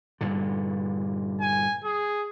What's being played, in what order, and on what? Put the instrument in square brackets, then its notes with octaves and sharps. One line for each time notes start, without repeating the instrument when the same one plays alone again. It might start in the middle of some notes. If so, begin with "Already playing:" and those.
[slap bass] G2 A#2 D3
[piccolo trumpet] G#5
G#4